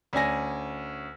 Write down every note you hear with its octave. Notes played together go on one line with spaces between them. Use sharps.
D2 C#4 D5 G#5 A#6